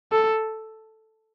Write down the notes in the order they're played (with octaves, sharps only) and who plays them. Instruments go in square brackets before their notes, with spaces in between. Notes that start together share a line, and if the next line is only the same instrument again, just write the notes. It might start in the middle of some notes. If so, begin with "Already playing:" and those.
[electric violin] A4